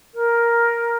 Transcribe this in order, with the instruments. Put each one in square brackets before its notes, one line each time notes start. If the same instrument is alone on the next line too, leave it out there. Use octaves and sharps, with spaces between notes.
[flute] A#4